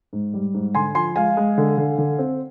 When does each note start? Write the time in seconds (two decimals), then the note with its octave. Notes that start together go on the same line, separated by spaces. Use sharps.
0.13 G#2
0.34 G3
0.54 G#2
0.75 D3 G#5 C6
0.95 F3 G#5 C6
1.16 G#3 F5 G#5
1.37 G#3
1.58 D3
1.78 D3
1.98 D3
2.19 C4